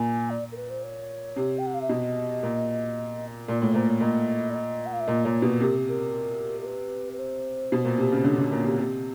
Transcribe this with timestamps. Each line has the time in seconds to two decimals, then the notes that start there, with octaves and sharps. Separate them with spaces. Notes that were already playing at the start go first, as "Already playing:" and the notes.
Already playing: A#2 G#5
0.30 D5
0.52 A#4
0.56 B4
0.70 C5
0.83 C#5
1.36 C3
1.58 G5
1.66 F#5
1.74 F5
1.81 E5
1.89 B2 D#5
2.43 A#2
3.48 A#2 D5
3.62 A2 C#5
3.74 A#2 C5
3.88 C#5
4.00 A#2 D#5
4.50 D5
4.54 D#5
4.86 F#5
4.93 F5
5.00 E5
5.07 A#2 D#5
5.25 A#2 C#5
5.42 B2 B4
5.60 C3 A#4
5.88 A#4
6.61 A#4
6.65 B4
7.13 B4
7.19 C5
7.72 B2
7.85 A#2
7.98 C3
8.12 C#3
8.24 D3 C#5
8.38 D3
8.52 A#2
8.64 C3
8.78 C3